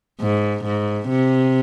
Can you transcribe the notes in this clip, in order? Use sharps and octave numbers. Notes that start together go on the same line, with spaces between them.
G#2
G#2
C3